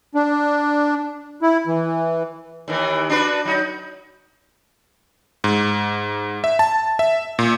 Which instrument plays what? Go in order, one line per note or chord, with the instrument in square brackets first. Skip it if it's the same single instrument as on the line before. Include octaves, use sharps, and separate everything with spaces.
[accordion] D4
E4
E3
[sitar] D#2 D#3 E3
D4 F#4 B4
F#3 D#4
[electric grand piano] G#2
E5
A5
E5
A#2